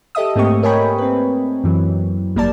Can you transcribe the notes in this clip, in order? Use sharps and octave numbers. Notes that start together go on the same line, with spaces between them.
G4 A4 D#5 E5 D#6
G#2 A3 A#3 C4 G4 C#6
A#4 C#5 D#5 G5 G#5 B5
C4 B4
F#2 E3 F#3
G#1 G3 A#3 A#4 D5 A5